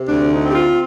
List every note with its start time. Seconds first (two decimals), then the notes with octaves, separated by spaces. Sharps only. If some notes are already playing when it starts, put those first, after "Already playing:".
Already playing: C3
0.08 D2 D4
0.32 D#4
0.43 C4
0.50 G4
0.55 F4